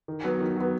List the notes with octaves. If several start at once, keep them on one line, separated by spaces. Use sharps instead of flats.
D#3
F#3 B3
D#3
F#3 B3